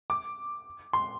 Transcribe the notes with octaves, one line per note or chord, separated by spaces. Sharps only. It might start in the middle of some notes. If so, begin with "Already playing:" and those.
D6
C6